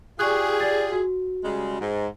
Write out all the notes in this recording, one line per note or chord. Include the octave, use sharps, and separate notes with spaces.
F4 G4 G#4 D5 C#6 F#6
D5 A6
F#4
C#3 G3 G#3
G#2